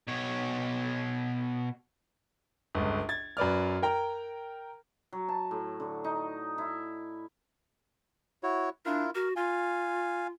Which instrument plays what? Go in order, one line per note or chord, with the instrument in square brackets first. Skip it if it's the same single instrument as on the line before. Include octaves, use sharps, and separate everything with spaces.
[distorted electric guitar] B2 C#5
[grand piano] G1 C#2
G#6 A6
F#2 B4 D5 F6
A#4 G5 A#5
[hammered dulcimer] F#3
A5
A2
D3
D#4
E4
[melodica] E4 F#4 C#5
[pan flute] D4 [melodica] E4 F4 A#4
[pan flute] F#4 [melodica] A#4
[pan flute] F4 [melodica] F5 G#5